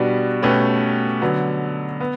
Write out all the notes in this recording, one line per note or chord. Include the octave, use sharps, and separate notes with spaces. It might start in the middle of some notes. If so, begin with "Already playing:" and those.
Already playing: B2 G3 D4 F#4 B4
B2 A3 C#4 G4 B4
D3 F#3 B3
B3